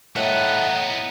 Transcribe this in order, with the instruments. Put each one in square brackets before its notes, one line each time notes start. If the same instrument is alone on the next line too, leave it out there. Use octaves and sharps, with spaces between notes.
[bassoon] A2 [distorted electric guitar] A3 B3 [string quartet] D#5 A#5 [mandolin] F#5